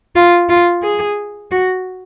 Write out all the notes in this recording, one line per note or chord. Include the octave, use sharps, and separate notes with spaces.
F4
F4
G#4
F#4